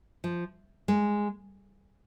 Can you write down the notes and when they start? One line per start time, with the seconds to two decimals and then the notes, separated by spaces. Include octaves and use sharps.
0.24 F3
0.88 G#3